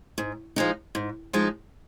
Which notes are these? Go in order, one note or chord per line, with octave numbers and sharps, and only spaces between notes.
G#2
F3 G#3 D#4
G#2
F3 G#3 D#4